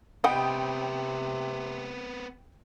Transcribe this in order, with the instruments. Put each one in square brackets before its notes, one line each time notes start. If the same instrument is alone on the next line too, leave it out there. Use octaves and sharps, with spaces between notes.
[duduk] C3 [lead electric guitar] B3 C4 [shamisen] D#5 F#5 [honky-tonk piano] G5 B5 D#6